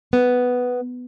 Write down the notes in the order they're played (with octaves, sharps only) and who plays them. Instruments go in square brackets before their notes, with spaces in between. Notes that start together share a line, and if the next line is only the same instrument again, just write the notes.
[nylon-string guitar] B3